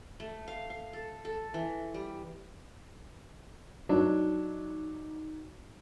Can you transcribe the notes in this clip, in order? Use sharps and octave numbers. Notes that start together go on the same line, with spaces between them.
A3
F5
F5
A4
A4
E3
G3
F#3 D4 D#4